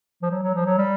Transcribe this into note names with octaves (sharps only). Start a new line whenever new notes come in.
F3
F#3
F#3
F3
F#3
G3